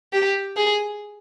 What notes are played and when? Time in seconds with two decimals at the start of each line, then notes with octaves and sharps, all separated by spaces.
0.13 G4
0.57 G#4